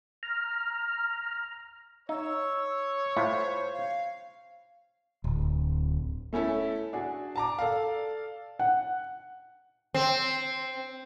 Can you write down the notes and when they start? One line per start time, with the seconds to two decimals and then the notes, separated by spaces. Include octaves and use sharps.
0.23 A#5 F6
2.09 D#4 C#5 E6
3.16 A2 E4 F4 C5
3.72 F5
5.24 D1
6.33 A3 C#4 E4 A4
6.93 D4 F#4 G#4
7.36 A5 A#5 D6
7.59 A4 D5 F5
8.59 F#5
9.94 C4